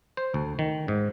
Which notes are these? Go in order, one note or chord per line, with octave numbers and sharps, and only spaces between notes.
C5
D2
D#3
G#2